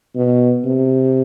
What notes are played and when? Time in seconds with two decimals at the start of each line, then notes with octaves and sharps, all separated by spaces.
0.15 B2
0.65 C3